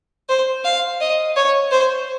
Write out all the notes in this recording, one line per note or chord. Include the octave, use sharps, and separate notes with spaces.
C5
F5
D#5
C#5
C5